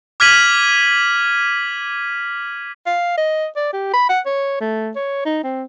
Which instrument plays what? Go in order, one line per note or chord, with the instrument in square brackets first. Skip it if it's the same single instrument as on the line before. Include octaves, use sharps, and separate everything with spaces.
[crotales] D6 F6 G#6 B6 D#7 F#7
[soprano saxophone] F5
D#5
D5
G4
B5
F#5
C#5
A3
C#5
D#4
C4